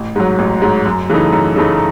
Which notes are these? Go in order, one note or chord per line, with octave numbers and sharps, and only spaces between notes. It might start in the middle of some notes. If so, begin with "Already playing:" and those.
Already playing: A1
G#2 F#3
A1
G#2 F#3
F#2
C#3 E3 A3 D#4
F#2
C#3 E3 A3 D#4